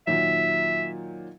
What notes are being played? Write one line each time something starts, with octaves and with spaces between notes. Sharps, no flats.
A#2 D#3 F#3 E5